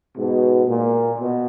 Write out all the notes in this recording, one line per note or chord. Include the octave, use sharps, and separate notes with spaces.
G#2 B2
A#2
B2